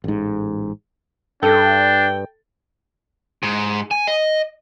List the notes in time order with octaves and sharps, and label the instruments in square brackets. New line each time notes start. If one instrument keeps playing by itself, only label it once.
[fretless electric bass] A1 G#2
[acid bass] G2 [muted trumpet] D4 [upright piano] A4 [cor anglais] G5
[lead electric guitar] G#2
G#5
D#5